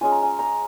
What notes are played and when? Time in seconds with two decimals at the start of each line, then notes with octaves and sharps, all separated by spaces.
0.01 G#3 C#4 F4 G#5
0.12 A#5
0.23 G#5
0.39 A#5